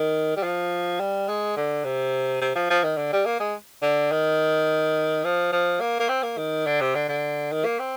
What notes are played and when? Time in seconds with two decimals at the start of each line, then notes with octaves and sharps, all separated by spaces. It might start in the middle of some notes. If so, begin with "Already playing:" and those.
Already playing: D#3
0.36 G3
0.43 F3
1.00 G3
1.28 G#3
1.57 D3
1.85 C3
2.41 C3
2.55 F3
2.70 F3
2.84 D#3
2.97 D3
3.12 G3
3.26 A#3
3.40 G#3
3.82 D3
4.12 D#3
5.24 F3
5.52 F3
5.81 A#3
6.00 A#3
6.09 C4
6.23 A#3
6.38 D#3
6.67 D3
6.81 C3
6.95 D3
7.08 D3
7.52 D#3
7.65 A#3
7.79 C4